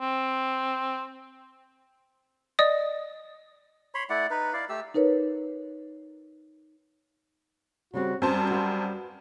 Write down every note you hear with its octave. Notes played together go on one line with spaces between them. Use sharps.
C4
D5 D#5 D#6
C#5 B5 C6
A3 E4 D5 F#5
D#4 B4
E4 D5 F5
A3 G4 E6
D#4 A#4 B4 C#5
C#3 G3 C4 F#4
F#2 G3 C4 C5 A5
F#4 B4 F5